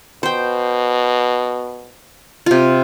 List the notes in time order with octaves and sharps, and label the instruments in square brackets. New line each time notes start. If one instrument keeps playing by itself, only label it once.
[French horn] B2 [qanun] C5 G5
[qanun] C3 F4